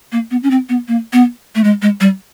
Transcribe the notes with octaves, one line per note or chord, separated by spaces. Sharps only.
A#3
B3
C#4
C4
B3
A#3
B3
A3
G#3
G#3
G3